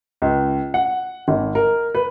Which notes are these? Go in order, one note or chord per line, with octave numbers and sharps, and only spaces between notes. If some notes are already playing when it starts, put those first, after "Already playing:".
C#2
F#5
G#1
A#4
B4